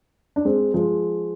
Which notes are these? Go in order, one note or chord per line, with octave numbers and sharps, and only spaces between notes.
D4
G#3 C4
F3 G#3